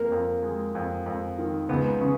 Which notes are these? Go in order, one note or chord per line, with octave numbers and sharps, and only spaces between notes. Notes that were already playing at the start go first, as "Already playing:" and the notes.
Already playing: F2 A#3
F2
G#3
F2
F2
D#3
C#2 B3
C#3